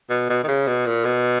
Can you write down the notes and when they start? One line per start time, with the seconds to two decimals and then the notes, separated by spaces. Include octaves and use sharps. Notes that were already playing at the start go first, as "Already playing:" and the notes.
0.10 B2
0.30 B2
0.44 D#3
0.48 C#3
0.67 B2
0.86 A#2
1.05 B2